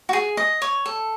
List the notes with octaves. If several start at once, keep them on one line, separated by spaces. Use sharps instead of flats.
F#4
G#4
D#5
C#5
A4